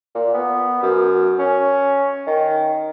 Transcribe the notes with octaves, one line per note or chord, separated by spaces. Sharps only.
A#2
B3
F#2
C#4
D#3